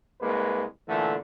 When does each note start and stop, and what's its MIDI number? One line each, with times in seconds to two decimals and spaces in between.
0.21 0.64 36
0.21 0.64 56
0.21 0.64 58
0.21 0.64 71
0.88 1.15 46
0.88 1.15 50
0.88 1.15 52
0.88 1.15 57